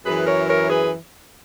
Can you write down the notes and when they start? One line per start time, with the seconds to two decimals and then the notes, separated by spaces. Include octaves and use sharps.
0.06 F#2 E3 G#4 B4
0.27 A#4 C#5
0.48 A#4 C#5
0.69 G#4 B4